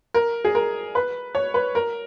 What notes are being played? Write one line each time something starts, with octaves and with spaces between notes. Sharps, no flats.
A#4
G#4
A#4
B4
C#5
B4
A#4